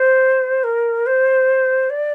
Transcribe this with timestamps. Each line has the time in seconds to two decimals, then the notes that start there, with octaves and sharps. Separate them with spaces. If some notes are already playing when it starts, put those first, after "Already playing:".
Already playing: C5
0.64 A#4
1.06 C5
1.90 D5